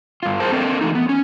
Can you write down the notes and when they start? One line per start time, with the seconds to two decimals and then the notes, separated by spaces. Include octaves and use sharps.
0.23 G2 F4
0.40 G#4 A#4 C5 A5
0.52 C4 A4 A#4
0.81 E3 A3 D#4
0.95 B3
1.09 C#4